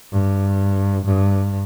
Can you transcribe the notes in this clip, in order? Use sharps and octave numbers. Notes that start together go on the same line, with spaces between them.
G2
G2